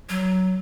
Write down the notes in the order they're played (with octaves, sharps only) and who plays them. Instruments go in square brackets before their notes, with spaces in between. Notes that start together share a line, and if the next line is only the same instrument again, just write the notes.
[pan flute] F#3